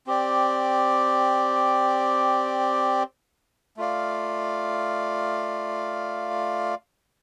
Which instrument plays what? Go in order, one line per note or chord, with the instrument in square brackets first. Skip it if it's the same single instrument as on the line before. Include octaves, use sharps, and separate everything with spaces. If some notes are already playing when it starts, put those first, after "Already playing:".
[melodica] C4 G4 D5
A3 F4 D5 F5